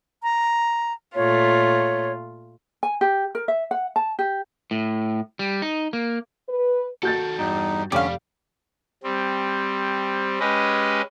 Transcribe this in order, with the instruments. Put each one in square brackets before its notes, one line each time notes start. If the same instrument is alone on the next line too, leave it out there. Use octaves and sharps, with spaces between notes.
[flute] A#5
[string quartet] A#2 A3 F4 [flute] C#5
[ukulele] G#5
G4
A#4
E5
F#5
A5
G4
[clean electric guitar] A2
G3
D#4
A#3
[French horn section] B4
[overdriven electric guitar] D#3 A4 [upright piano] F#4 G6 A6
[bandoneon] E2 D#4 [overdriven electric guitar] G2
[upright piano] F1 [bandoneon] D3 C#4 [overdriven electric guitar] G3 [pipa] G4 F5
[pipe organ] G3 C4
G#3 C#4 G4 B4 D#5